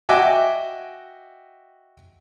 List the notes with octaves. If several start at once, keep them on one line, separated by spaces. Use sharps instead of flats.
F#4 D#5 E5 G5 G#5 D6